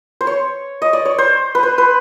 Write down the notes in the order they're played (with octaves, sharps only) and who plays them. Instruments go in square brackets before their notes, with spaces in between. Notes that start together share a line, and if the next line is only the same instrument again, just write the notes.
[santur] C5
C#5
D#5
D5
C#5
C5
B4
C5
B4